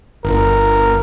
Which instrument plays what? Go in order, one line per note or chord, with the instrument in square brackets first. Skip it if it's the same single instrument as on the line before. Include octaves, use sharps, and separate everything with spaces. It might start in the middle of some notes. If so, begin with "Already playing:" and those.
[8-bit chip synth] G1 [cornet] A#4